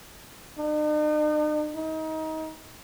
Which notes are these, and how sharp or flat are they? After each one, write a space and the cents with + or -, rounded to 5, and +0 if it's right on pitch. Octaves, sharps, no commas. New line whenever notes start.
D#4 -45
D#4 +25